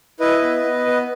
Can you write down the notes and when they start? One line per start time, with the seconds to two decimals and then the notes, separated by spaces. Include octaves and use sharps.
0.20 E4 B4 D#5
0.42 B3
0.64 B3
0.86 B3